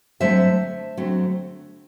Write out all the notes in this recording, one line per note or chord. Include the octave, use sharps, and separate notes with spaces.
D3 F#3 A3 C4 C5 E5
D3 F#3 A3 C4